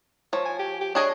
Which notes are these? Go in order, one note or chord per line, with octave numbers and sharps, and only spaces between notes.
F3 C#5
G#5
G4
G4
D4 G#4 C#5 D#5